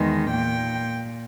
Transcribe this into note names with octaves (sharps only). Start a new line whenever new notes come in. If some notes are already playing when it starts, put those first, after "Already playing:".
Already playing: E2 D#3 G#3
A#2 G5